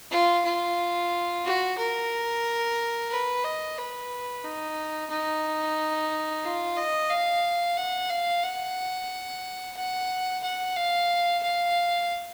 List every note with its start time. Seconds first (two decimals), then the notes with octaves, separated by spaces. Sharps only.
0.11 F4
0.45 F4
1.45 F#4
1.78 A#4
3.11 B4
3.44 D#5
3.78 B4
4.44 D#4
5.10 D#4
6.43 F4
6.77 D#5
7.10 F5
7.77 F#5
8.10 F5
8.43 F#5
9.76 F#5
10.43 F#5
10.76 F5
11.42 F5